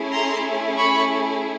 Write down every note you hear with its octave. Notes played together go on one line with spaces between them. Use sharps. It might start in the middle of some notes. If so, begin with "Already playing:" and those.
Already playing: A3 C#4 E4 G#4
A#5 C6
B5 C#6